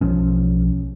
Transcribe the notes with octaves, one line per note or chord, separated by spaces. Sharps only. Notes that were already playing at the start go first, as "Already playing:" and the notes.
B1 F3 C#4